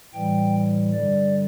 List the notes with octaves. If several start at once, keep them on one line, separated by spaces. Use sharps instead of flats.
A2 E3 G3 G5
G2 D3 G3 D5